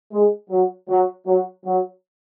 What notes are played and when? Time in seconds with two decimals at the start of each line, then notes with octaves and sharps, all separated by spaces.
0.12 G#3
0.50 F#3
0.89 F#3
1.27 F#3
1.65 F#3